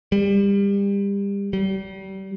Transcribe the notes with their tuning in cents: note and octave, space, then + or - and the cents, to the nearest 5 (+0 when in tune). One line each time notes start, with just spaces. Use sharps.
G3 +30
G3 -30